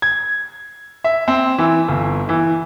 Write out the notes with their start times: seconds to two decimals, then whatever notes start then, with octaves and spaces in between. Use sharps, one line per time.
0.02 G#6
1.04 E5
1.28 C4
1.58 E3
1.88 G1
2.29 E3